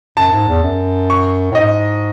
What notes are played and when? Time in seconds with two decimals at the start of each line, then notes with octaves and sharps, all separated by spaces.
0.17 F#2 A5
0.32 G#2
0.48 E2
0.63 F#2
1.10 C#6
1.51 A2
1.55 G#2 D#5